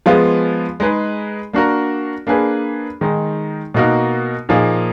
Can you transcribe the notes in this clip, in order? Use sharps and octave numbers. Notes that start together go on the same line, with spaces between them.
F3 G#3 B3 F4 G#4
G#3 D#4 G#4 B4
A#3 D4 F#4 A#4
A#3 D4 G#4 B4
D#3 G#3 D#4
B2 A#3 D#4 F#4 A#4
A#2 F3 A#3 D#4 G#4